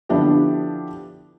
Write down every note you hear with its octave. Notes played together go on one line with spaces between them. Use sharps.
D3 F3 B3 D4 E4 G4